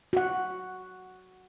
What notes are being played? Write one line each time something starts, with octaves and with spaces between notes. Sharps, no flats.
F#4 F#5